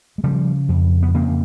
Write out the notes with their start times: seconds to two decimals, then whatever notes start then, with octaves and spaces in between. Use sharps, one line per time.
0.18 G#3
0.23 C#3 F3 G3
0.69 F2
1.03 B3
1.14 C#3 A#3 C4